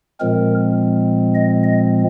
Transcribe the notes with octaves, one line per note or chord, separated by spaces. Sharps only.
A#2 F3 G#3 C4 A#4
D#5
D#5